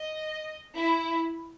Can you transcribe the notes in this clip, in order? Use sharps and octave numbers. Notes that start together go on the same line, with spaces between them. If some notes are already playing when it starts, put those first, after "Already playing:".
Already playing: D#5
E4